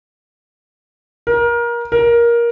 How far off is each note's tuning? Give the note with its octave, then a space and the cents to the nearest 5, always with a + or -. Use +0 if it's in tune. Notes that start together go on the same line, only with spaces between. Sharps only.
A#4 +25
A#4 +15